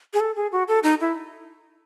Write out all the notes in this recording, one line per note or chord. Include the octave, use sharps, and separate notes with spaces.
G#4
A4
G#4
F#4
A4
D#4
E4